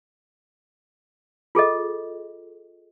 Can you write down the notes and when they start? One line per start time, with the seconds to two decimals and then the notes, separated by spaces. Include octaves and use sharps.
1.55 F4 G#4 A4 D#5